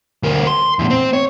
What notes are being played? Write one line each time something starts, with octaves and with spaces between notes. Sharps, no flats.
D2 A#4
C6
E2 A2
C4
C#5